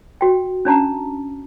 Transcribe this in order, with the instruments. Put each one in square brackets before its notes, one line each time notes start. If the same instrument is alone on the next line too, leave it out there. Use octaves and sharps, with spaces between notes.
[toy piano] F#4 G5
C#4 D4 A5 A#5